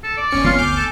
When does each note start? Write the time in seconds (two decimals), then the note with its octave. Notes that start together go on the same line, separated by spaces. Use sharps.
0.04 A4
0.17 D5
0.31 G1 C#4 C#7
0.44 D#3 B3 C4 F4 C6
0.59 G1 D2 B3 G#5 D6 F6 G6
0.76 A4